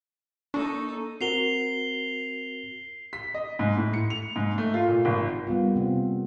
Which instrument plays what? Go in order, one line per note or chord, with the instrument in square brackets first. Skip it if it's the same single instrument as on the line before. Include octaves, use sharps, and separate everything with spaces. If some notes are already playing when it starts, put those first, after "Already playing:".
[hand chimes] A#3 C#6 [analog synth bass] D4 [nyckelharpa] D#4 A4
[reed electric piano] C4 F#4 A#4 [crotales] C7 F7 G7
[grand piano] B6
D#5
G#2
A2
C#7
F7
G#2
A3
F4
A#2
G#1
[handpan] G3 A#3 B3 F4
C3 C4